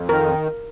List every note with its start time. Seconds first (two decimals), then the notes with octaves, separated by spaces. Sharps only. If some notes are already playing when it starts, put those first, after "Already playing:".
Already playing: F2
0.09 D#3 A#4